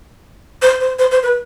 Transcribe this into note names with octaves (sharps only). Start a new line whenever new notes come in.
C5
C5
C5
C5
B4